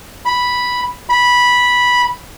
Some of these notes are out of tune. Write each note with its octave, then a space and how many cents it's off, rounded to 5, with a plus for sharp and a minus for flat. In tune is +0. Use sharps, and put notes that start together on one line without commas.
B5 -5
B5 -10